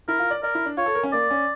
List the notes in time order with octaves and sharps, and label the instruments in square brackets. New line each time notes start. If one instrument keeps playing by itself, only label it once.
[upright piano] E4 [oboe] A#4
[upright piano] F4
D5
[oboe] A#4 [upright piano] D5
[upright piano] E4
D4
[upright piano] F4 [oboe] C#5
[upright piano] A4
A#4
C#4
[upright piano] A#3 [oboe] D5
[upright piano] C#4